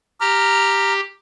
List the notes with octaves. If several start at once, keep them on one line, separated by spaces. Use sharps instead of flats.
G4 A#5 F6